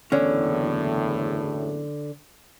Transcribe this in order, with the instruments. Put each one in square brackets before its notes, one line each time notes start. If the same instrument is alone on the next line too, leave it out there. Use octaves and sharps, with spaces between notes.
[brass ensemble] F#1 E2 A2 [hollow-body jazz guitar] D3 C#4